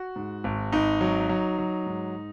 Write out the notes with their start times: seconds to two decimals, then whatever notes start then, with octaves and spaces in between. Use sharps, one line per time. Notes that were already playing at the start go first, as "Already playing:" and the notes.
Already playing: F#4
0.16 G#2
0.44 G#1
0.72 G#1 D#4
1.01 F#3
1.29 F#3
1.58 F#3
1.86 G#2